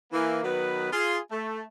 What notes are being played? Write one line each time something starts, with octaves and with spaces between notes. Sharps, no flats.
E3 A#3
D#3 F#3 B3 B4
F4 G#4
A3